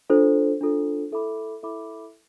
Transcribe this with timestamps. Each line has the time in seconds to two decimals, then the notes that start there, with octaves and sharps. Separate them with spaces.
0.10 D4 F4 A4 C5
0.61 D4 F4 A4 C5
1.11 E4 A4 E5 B5 D6
1.63 E4 A4 E5 B5 D6